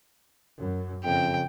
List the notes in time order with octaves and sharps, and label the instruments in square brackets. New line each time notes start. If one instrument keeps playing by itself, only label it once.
[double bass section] F#2
[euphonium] F2 [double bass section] C#3 [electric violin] G5